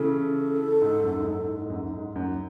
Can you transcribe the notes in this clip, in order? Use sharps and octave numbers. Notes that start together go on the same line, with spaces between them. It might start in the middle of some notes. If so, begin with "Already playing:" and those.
Already playing: C#3 E3 A4
G#2
F#2
G#2
F#2
G#2
G#2
F#2
G#2
F#2